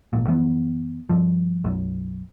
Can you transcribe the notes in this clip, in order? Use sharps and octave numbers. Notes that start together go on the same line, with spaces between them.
G#1 A#2
F#2 E3 B3
G2 F3
B1 F#2